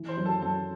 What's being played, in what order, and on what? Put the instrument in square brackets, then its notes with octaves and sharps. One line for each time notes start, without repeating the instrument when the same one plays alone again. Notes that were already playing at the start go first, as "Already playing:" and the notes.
Already playing: [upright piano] E3
[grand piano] C5 C6
[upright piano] F#2
[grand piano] A4 A5
[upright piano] F#2 [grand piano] A4 A5